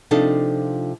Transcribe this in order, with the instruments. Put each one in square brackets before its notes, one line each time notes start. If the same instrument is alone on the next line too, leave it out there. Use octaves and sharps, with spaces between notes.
[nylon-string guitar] C3 F3 D4 D#4 F4 A4